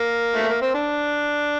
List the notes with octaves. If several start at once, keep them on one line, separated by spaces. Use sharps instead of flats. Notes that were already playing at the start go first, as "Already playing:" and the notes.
Already playing: A#3
A3
A#3
C4
D4